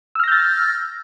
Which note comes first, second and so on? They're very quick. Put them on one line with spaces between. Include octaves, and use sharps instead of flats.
E6 F6 A#6 G6 A6